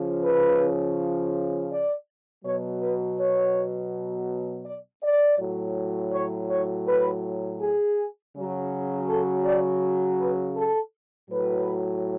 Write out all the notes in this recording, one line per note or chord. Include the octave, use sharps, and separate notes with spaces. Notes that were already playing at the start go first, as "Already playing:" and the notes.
Already playing: C#3 F3
B4
D5
B2 F#3 C#5
B4
C#5
D5
D5
A2 F#3
C#5
C#5
B4
G#4
C#3 F#3
A4
D5
B4
A4
A2 F#3 B4